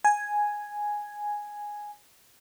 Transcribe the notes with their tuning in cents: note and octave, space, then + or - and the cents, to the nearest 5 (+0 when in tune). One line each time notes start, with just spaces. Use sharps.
G#5 +0